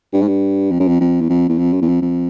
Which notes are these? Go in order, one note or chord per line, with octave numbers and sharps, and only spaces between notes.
G2
G#2
G2
F2
F#2
F2
F2
E2
F2
E2
F2
F#2
E2
F2
F2